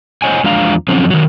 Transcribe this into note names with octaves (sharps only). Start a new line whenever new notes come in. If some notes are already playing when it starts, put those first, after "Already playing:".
C5 C#5 D#5 F#5 G#5
E2 F3 G#3 D4 F5 A#5
D3 F3 F#3 C4 C#4
D#3 F#3